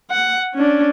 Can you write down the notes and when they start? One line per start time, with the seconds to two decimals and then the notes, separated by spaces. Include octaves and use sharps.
0.11 F#5
0.55 C#4 D4